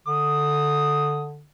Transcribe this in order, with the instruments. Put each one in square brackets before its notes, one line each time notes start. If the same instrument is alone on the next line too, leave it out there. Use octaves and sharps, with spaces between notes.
[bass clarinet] D3 [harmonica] D#6